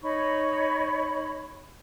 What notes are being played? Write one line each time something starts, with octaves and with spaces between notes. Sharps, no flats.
D#4 C#5 B5 C#6